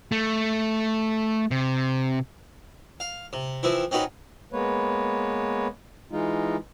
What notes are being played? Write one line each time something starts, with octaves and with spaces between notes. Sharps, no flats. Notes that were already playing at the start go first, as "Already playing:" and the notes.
A3
C3
F5
C3
E3 F3 C4 E4
C4 C#4 D#4 F#4 B4
G#3 A#3 B3 B4 C#5
E3 G#3 D#4 F4